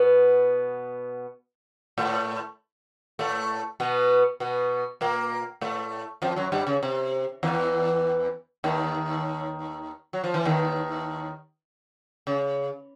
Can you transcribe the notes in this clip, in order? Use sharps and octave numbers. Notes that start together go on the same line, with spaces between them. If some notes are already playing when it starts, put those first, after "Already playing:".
Already playing: B2 B3
A2 A3
A2 A3
B2 B3
B2 B3
A#2 A#3
A2 A3
F2 F3
F#2 F#3
G2 G3
C#3
C3
E2 E3
D#2 D#3
F#3
F3
E3
D#2 D#3
C#3